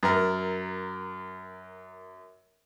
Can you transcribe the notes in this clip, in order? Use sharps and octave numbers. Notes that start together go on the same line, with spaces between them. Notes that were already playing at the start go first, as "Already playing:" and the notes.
F#2 A#4